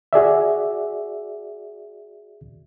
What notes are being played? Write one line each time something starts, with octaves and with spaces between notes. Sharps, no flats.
F#4 G#4 D5 E5